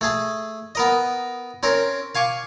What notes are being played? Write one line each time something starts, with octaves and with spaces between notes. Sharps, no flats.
A3 G#4 A5
B3 A#4 D#5
C4 C#4 A#4
F5 G#5 C#6 D6